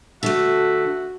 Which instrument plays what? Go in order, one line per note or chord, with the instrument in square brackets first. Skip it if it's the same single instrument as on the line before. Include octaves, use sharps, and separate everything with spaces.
[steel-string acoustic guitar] D3 A3 [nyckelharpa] F#4 [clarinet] E5